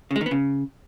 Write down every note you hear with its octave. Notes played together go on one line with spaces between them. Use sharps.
C#3
G#3
D#3
B3
C#3